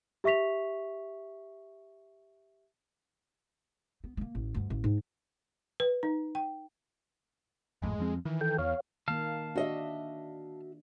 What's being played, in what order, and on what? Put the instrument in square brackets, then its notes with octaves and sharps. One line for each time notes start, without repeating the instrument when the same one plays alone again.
[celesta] G4 E5 C#6 B6 F7
[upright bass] B3
A3 A#3
A1
D2 G2
A1
G#2
[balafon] B4
D#4
G5
[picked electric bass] G#1 F2 A2 [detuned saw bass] G#3
[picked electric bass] F2 F3 C4
[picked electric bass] D#3 [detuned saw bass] E3
[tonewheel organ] A4 G5
[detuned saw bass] E2 [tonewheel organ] C#5 F5
[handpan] D#3 A#3 [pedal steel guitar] F5 A5 F6
[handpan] D4 [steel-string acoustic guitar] F#4 D#5 E5